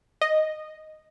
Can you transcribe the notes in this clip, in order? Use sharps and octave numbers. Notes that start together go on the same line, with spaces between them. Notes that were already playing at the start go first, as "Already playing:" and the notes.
D#5